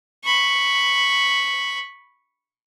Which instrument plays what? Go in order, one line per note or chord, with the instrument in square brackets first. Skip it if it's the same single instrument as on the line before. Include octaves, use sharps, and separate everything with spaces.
[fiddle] B5 C#6